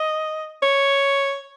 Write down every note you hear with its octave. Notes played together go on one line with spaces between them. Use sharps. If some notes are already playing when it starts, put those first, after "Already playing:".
Already playing: D#5
C#5